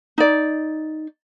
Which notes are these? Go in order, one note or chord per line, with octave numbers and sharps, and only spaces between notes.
D#4 D5